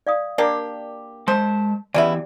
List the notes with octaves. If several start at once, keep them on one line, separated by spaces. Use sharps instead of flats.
D5 F5 D#6
A#3 D4 G4 A#4 D5
G#3 C5 A5
E2 C#3 E3 B3 E4 G4 D5 E5